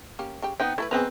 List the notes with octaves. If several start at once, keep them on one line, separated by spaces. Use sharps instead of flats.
A#3 C#4 G4
C#3 G4 G5
B3 C4 D#4 G5
A3 E4 A4 B4
D#3 B3 C4 G#4 B4 C5 A#5